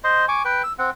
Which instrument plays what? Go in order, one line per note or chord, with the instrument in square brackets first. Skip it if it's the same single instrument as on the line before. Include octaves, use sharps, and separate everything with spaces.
[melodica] C5 D#5 C6
G#5 C#6 D6
B4 G5
E6
C4 F#5